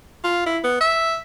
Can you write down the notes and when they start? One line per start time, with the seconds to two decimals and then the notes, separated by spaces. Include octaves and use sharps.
0.24 F4
0.46 E4
0.64 B3
0.81 E5